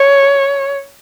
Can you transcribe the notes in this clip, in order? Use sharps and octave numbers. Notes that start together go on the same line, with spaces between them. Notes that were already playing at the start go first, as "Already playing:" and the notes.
Already playing: C#5